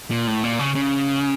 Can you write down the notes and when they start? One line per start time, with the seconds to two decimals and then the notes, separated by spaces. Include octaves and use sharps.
0.11 A#2
0.27 A2
0.44 A#2
0.59 C#3
0.75 C#3